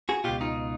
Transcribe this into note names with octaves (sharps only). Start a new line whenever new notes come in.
F#4 G#4
C#2 B2 F4 G4
D#4 F4